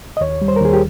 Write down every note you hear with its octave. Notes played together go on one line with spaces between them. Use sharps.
D#5
D#2 C#5
G3
C5
A#4
D#2 G#4
G4